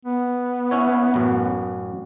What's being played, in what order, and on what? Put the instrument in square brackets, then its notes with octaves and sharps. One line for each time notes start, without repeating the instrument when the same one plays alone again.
[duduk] B3
[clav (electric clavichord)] C#4 E4 C#5
A1 F#2